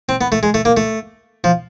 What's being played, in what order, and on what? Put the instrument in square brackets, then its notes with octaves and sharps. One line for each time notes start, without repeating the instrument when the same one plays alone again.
[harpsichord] C4
B3
A3
G#3
A3
A#3
A3
F3